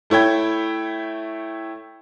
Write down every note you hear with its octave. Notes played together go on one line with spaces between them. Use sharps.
A3 E4 C#5 G5 G#6